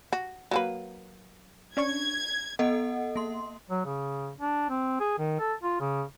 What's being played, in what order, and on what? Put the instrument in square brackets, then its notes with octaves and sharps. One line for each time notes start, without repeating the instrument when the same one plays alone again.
[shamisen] F#4
F#3 A#3 B4
[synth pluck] C#4 D4 C#6 [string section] G#6
[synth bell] B3 A4 D#5 F#5
A#3 C6
[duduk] F#3
C#3
D4
C4
G#4
D#3
A4
F4
C#3